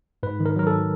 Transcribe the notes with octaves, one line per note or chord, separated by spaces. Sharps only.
G#2 B4
D#3
A#4
F#3 A#4
A4